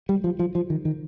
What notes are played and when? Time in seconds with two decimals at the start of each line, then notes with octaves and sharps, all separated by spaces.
0.09 G3
0.24 F3
0.39 F3
0.55 F3
0.70 D#3
0.85 D#3